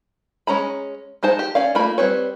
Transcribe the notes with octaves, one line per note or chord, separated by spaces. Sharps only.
G#3 C#4 A#5 B5
G#3 D#4 C5 A5
G4
C#4 D5 F5
A3 A#3 F4 B5
G3 C4 B4 C#5